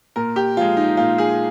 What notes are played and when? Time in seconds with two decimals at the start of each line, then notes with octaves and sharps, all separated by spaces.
0.16 A#2 A#4
0.36 G4
0.57 F3 G#3 F4
0.77 D#4
0.97 A#2 F4
1.18 G#4